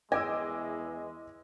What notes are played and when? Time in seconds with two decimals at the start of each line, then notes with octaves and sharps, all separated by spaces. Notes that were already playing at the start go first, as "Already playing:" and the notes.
0.12 E2 E3 G#3 D#5 G#5 D6 E6